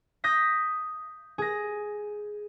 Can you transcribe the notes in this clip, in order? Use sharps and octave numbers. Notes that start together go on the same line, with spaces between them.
D#6 G6 A#6 B6
G#4 A#6